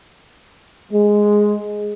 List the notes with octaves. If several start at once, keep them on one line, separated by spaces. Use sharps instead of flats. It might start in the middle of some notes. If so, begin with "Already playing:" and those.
G#3